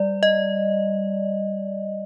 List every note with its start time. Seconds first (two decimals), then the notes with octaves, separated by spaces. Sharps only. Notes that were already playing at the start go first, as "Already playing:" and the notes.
Already playing: G3 D5
0.23 D#5